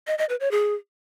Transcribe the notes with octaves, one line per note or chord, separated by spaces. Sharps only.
D#5
D#5
B4
C#5
G#4